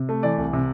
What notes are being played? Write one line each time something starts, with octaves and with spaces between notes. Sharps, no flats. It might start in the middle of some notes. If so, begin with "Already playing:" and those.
Already playing: C3
A3
E3 D5
C2
C3